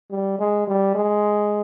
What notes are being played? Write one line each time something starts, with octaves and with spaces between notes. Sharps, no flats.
G3
G#3
G3
G#3